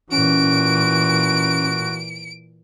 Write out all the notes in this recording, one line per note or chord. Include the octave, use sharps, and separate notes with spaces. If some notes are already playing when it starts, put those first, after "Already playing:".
A#2 E3 C#4 F#4 D7